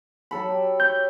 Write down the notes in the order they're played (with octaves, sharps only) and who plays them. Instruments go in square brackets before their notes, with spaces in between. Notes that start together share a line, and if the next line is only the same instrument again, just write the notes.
[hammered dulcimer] F#3 A4 B5
G4
[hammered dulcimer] C#5 D#5 [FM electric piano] G6